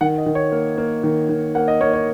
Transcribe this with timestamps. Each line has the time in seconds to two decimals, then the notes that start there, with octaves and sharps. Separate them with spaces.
0.01 D#3 F#5
0.18 D#5
0.26 D#3
0.35 C#5
0.52 A#3
0.78 A#3
1.03 D#3
1.29 D#3
1.55 A#3 F#5
1.68 D#5
1.81 A#3 C#5
1.93 C#5